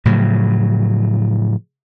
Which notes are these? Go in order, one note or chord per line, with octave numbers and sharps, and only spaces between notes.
A2 C#3 F3 F#3